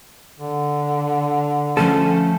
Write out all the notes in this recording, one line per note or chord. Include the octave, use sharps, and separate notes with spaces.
D3
F3 A3 C#4 A4